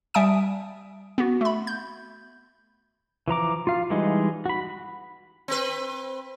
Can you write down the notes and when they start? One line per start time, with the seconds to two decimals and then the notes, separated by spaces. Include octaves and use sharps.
0.14 G3 E5 G#5 A5 D#6 D7
1.18 B3 F#4
1.41 A3 B5
1.67 G6
3.28 E3 F3 A#5 D6
3.67 F4 F5
3.90 E3 G3 G#3 D#4
4.46 F#4 B5
5.48 C4 B4